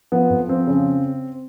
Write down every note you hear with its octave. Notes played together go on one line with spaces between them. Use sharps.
F3 B3
F2
F3 C4
C#3